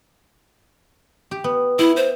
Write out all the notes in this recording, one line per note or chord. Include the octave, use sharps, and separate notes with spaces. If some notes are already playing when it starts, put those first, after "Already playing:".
G4
B3
E4 E5
C5